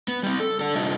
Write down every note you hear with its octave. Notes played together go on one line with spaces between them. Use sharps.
B3
G3 C4
A4
D4 A4
C3 G3 D4 D#4 F4 D#5